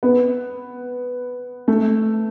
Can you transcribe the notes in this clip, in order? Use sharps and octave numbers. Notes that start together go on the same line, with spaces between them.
B3
A3